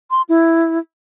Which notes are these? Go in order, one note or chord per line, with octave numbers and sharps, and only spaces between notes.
C6
E4